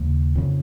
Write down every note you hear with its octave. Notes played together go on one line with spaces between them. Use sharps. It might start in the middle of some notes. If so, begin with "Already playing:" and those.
Already playing: D#2 C#3 A#3
F2 C#3